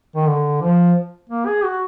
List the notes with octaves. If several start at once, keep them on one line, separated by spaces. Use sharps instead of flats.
D#3
D3
F3
A#3
G#4
F#4